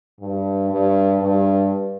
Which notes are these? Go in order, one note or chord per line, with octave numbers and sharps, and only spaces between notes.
G2
G2
G2